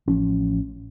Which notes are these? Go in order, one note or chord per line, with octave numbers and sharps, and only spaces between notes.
A1 F3 C#4